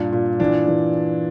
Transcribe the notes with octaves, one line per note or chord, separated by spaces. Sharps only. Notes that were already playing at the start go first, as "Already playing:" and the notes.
Already playing: G2 A#2 D4
A#2
E3 D4
E3